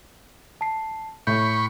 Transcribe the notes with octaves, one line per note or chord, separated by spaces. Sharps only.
A5 C7
A2 B5 C#6 G6